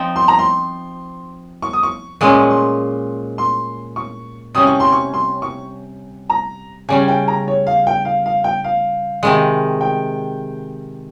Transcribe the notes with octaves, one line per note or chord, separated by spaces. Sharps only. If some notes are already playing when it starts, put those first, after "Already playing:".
Already playing: F3 C4 D#4
C6
A#5
C6
C#6
D#6
C#6
A#2 G#3 C#4 C6
C#6
C6
C6
C#6
C3 G3 C#4 D#6
C#6
C6
C#6
C6
C#6
A#5
C#3 G3 C#4 G#5
G5
A#5
C#5
F5
G5
F5
F5
G5
F5
C3 D#3 G#3
G5